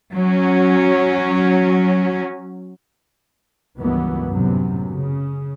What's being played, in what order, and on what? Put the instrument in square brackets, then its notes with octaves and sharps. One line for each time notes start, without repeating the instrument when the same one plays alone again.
[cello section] F#3 C#4
[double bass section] C#2 G2 D#3 E3 F#3 B3
F#2 A2 C3 F#3 B3
C#3